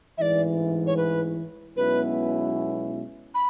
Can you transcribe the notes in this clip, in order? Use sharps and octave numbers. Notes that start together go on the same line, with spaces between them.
A1 G#2 E3 D5 E5
C#5
B4
B1 B2 G#3 C#4 E4 B4
B5